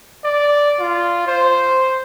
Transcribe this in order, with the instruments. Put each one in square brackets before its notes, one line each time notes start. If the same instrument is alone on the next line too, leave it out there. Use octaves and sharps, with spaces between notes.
[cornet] D5
F4
C5